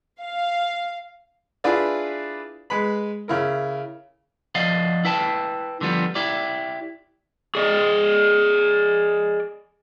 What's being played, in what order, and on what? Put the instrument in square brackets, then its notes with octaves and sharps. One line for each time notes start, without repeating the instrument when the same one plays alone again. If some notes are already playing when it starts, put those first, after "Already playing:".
[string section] F5
[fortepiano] D4 E4 F4 G#4 B4 D5
G#3 B4 B5
C#3 E4 A#4
[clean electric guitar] F3 D5 D#5 F5 F#5
E4 B4 G5 A5
D3 F3 G3 B3
E4 G4 D5
[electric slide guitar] G#4 D5 D#5